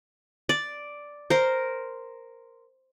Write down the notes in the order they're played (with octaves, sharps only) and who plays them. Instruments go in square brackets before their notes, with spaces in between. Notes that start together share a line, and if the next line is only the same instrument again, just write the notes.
[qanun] D5
A#4 C5